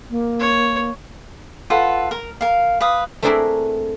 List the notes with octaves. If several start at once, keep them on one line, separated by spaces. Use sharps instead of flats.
A#3
C#5
F4 A4 B4 F#5
A#4
A#4 F5
B4 F5 D#6
A3 C4 D4 E4 G#4 A#4